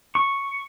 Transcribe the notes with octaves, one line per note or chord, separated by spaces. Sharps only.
C#6